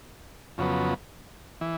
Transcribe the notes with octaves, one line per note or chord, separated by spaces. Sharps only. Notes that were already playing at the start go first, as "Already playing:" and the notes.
F2 C#3 F#3 B3
E3